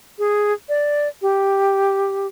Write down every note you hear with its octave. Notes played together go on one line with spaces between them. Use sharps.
G#4
D5
G4